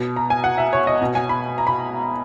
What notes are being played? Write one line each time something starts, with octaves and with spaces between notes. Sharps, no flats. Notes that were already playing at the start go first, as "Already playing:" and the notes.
Already playing: B2
A#5
G#5
F#5
E5
C#5
D#5
B2
G#5
B5
A#5
B5